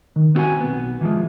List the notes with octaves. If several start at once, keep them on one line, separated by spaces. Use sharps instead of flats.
D#3
B3 C4 F#4 F5 F#5 G#5
B1 B3
E3 F3 G#3